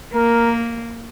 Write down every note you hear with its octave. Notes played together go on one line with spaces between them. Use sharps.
A#3 A#4